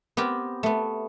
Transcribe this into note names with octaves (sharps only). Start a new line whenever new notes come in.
B3 C4 G4 A#4
A3 B3